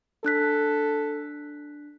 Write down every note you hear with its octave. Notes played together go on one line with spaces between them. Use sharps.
D4 A4 F#6 B6